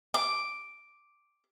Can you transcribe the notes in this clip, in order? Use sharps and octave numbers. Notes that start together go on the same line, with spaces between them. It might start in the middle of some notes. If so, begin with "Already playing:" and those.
D6